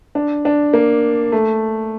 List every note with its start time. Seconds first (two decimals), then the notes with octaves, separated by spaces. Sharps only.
0.15 D4
0.45 D4
0.73 A#3
1.32 A3